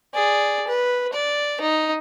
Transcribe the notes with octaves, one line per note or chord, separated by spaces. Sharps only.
G#4 D5
B4
D5
D#4